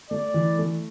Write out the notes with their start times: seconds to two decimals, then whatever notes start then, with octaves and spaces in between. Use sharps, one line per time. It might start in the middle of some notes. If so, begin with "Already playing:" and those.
0.11 A3 D5
0.34 E3
0.59 A3